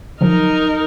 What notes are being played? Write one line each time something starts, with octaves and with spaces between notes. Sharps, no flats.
D3 F3 F#3 D#4 A#4